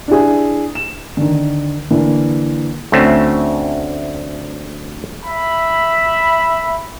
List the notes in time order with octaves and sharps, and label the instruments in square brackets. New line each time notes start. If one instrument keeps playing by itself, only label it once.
[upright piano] D4 E4 G#4
E7
D3 D#3
D3 E3 A#3
[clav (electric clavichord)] D2 A3 C4 C#4
[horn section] E5 B5